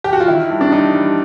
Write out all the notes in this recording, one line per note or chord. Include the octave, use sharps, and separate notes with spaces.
G4
F#4
F4
D#3 E4
G2
D4
G2 D#4
G2